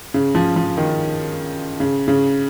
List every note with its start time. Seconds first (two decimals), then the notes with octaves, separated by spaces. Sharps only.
0.14 C#3
0.35 F3
0.56 F3
0.77 D#3
1.80 C#3
2.08 C#3